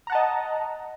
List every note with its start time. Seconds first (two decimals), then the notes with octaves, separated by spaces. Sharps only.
0.07 A#5
0.10 F#5
0.12 A5
0.15 D#5